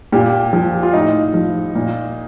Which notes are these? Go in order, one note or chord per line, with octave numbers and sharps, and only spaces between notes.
A#2 G4
F3
F4
A2 D#4
F3
A#2